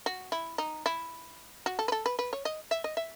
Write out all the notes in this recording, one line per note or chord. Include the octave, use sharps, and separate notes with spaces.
F#4
E4
D#4
E4
F#4
A4
B4
A4
B4
B4
C#5
D#5
E5
D#5
E5